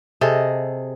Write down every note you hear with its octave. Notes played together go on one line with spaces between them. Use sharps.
C3 G#4 A4 D#5